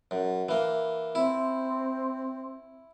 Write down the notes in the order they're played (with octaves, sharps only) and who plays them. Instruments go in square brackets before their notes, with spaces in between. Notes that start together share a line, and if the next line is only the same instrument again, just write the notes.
[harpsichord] F#2
E3 A#3
[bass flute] C4 [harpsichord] E4